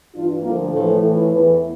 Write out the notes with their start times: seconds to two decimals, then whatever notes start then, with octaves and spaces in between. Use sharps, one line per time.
0.14 G2 E3 D4 F4
0.42 D2 D3 F3 G3 A#3
0.71 A2 E3 F3 A3
0.99 A2 E3
1.27 E2 E3